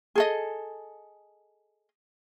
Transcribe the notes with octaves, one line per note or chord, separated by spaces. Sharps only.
G#4 A4 D#5